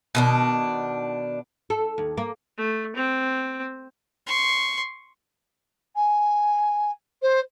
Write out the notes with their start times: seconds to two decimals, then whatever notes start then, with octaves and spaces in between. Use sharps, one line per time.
0.15 B2 D#3 D4
1.70 A4
1.98 D#2
2.17 A#3
2.58 A3
2.96 C4
4.27 C6 C#6
5.95 G#5
7.22 C5